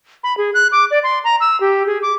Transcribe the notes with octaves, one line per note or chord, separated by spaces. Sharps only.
B5
G#4
F#6
D6
D5
C6
A#5
E6
G4
G#4
D6